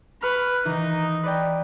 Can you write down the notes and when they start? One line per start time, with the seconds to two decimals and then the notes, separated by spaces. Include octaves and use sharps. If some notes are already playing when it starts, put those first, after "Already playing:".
0.22 B4 B5 C#6 F6
0.65 D#3 E3 D#4
1.23 B4 D5 G5